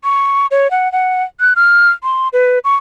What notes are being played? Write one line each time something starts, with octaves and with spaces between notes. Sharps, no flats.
C#6
C#5
F#5
F#5
F#6
F6
C6
B4
C#6